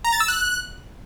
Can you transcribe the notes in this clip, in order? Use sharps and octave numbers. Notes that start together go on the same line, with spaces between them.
A#5
A6
E6
F#6